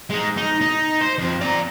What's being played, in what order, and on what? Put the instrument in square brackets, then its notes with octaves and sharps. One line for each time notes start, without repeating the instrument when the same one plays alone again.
[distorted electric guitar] G#3 D#4
D#4
D#4
C5
F2
D5 A#5